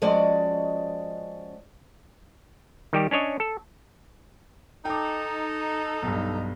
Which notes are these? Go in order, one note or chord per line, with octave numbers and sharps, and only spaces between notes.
F3 G#3 C#4 F#4 D5 D#5
D#3 G3 G4
C#4 D4 C#5 D#5
A4
D#4 A4 G5 D6
B1 G2